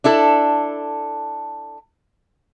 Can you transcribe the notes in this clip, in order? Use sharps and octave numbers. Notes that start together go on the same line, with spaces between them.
D4 E4 A4